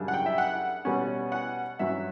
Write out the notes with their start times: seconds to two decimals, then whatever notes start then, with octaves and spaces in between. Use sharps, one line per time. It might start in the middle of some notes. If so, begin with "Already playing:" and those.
Already playing: F#2 C#3 G3 D4
0.08 F#5
0.14 G5
0.26 E5
0.38 F#5
0.85 B2 G3 C#4
1.32 F#5
1.79 G2 F#3 C#4 E5